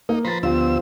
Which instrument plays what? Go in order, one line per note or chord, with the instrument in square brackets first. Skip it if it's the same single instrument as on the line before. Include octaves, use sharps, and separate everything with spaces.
[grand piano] A#3 [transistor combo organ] D#4
[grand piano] F3 A6 [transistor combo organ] B4 C5 A#5
[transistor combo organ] D2 E6 [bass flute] B3 [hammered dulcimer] F4 G4 C5